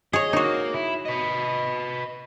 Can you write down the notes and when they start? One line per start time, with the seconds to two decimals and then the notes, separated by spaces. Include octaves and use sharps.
0.13 G#4 C#5 D#5
0.33 A#3 D#4 F#4
0.74 E4
1.05 B4 D#5